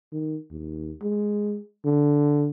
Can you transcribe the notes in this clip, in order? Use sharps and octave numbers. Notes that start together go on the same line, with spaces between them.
D#3
D#2
G#3
D3